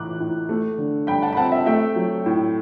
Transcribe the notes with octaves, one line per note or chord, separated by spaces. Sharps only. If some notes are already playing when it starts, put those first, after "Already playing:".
Already playing: A2 E3 D6 F#6
A2
A3
D3
G2 G5 B5
F#5 A5
B5
C4 F#5 A5
E5
A3 E5 G5
F#3
A2